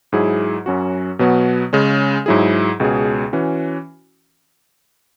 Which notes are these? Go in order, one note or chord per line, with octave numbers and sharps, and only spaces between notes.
G#2 F#3 E4 G#4
F#2 F#3 C#4 F#4
B2 F#3 B3 F#4
C#3 G#3 C#4
G#2 F#3 E4 G#4
C#2 B2 G#3 C#4 G#4
E3 C#4 F#4